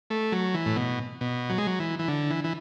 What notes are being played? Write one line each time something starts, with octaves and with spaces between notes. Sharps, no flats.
A3
F#3
E3
A2
B2
B2
F#3
G#3
F#3
E3
E3
D3
E3
E3